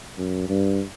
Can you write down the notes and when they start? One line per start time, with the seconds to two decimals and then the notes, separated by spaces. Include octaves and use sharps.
0.18 F#2
0.49 G2